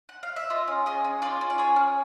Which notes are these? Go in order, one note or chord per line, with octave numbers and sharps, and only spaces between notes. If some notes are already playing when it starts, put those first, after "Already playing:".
F#5
F5
E5
F4 D#5
C#4
G#4 D#5
C#4
F4 D5
C#4
D5
G#4 C#5
C#4